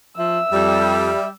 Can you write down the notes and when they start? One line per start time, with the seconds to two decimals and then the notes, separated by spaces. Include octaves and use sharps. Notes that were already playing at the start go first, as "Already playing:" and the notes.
0.18 F3 E5 E6
0.52 F2 G3